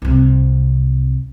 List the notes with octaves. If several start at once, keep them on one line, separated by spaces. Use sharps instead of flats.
C2 C3